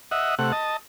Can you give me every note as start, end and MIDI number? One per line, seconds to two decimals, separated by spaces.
0.11 0.35 75
0.11 0.35 76
0.11 0.35 78
0.39 0.52 48
0.39 0.52 57
0.39 0.52 78
0.52 0.77 75
0.52 0.77 81